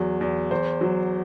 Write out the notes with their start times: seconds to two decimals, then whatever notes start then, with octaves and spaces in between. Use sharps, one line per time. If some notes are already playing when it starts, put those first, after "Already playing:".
Already playing: E2 F#3
0.21 E2
0.51 E2 C5
0.81 F#3